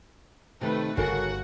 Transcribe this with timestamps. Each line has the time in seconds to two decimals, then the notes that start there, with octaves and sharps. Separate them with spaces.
0.61 C3 D#3 A3 B4
0.97 G1 C#3 F#4 A4 A#4 F#5